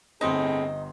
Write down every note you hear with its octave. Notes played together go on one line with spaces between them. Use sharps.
G1 A2 C4 D#4 G#4 C6